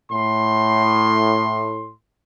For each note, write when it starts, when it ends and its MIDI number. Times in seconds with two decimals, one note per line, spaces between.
0.11 1.92 45
0.11 1.92 84